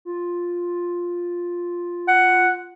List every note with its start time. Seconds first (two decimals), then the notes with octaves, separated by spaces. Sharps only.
0.05 F4
2.08 F#5